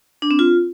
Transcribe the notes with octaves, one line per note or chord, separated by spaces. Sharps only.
D4
C4
F4